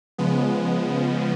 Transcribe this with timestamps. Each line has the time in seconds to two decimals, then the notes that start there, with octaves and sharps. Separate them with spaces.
0.18 C#3 F3 G#3 B3